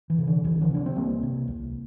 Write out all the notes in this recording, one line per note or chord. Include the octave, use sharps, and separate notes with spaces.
E3
C3
D3
C2 E3
D3 F3
C3 D4
C4
C2 G3 A#3
C3
C2